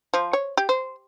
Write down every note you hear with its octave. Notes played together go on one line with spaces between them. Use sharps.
F3
C#5
G4
C5